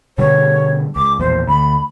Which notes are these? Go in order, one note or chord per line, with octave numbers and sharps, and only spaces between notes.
B2 D3 G3 C#5
C#2 D6
E1 A#1 E2 C5
D2 B5